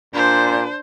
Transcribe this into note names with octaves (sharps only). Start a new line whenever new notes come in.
A#2 D4 C5